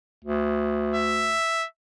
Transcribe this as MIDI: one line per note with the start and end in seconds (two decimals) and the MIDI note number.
0.25 1.37 38
0.95 1.66 76